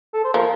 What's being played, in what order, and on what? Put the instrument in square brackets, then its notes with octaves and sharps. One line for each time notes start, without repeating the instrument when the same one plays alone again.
[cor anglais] A4
C5
[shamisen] F3 [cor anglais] A#4